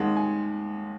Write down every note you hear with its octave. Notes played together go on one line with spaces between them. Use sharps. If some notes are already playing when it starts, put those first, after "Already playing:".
Already playing: D#2 D#3 G#3 F#5
G#5